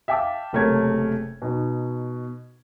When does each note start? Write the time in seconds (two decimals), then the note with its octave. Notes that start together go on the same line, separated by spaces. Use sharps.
0.08 E5 F5 G5 A5 D6 E6
0.53 F#1 C3 A3 A#4 C#5 G#6
1.42 B2 D#4